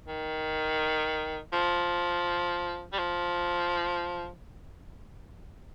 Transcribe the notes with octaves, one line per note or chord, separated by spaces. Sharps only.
D#3
F3
G3
F3